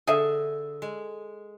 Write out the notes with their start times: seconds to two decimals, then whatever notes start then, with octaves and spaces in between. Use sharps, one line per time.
0.07 D3 G#4 E5
0.82 G#3